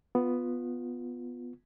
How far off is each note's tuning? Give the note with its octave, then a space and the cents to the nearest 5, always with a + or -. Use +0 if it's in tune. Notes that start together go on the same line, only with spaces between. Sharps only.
B3 +0 F4 +10